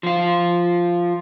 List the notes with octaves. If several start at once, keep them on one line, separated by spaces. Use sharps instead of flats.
F3 F4